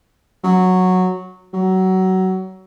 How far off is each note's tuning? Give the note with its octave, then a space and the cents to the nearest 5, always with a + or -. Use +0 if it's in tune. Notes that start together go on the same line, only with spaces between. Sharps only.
F#3 -5
F#3 +20